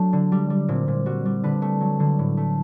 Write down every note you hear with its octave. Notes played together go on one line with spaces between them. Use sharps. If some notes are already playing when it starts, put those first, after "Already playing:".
Already playing: F#3 A3 D4
D3
G3
G3
A#2 C4
A#2
G3 F#4
G3
D3 B4
A3
F#3
D3
A2
A3